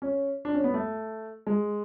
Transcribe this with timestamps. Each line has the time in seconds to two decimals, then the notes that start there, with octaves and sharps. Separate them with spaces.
0.02 C#4
0.45 D4
0.54 C#4
0.64 B3
0.74 A3
1.47 G#3